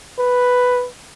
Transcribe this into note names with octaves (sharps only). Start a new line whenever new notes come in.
B4